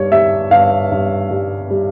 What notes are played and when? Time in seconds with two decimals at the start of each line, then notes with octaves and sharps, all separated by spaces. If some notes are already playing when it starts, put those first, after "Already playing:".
Already playing: G2 G3 C#5
0.12 G3 E5
0.51 G2 F5
0.92 G2
1.31 G3
1.71 G3